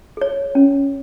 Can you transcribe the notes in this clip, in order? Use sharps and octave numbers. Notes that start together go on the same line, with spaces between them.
G#4 C#5
C#4